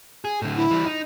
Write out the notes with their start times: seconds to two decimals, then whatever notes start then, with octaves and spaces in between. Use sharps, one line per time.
0.25 G#4
0.42 A2 D3
0.56 E4
0.71 E3 G3
0.85 D#4